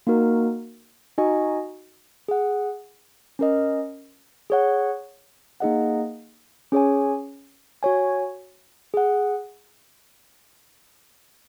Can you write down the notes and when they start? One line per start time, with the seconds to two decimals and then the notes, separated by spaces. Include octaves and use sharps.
0.07 A#3 D#4 F#4 A#4
1.18 D#4 F#4 D#5 G#5
2.28 G#4 F#5
3.39 C#4 A#4 D#5
4.50 G#4 C#5 F#5
5.60 A#3 D#4 G#4 D#5 F#5
6.72 C#4 G#4 C#5 G#5
7.83 F#4 C#5 G#5
8.94 G#4 F#5